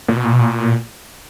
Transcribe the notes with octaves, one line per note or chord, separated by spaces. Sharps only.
A#2
B2
A#2
B2
A#2